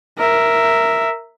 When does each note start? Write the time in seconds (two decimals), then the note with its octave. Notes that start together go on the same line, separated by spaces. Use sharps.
0.18 A#4 E5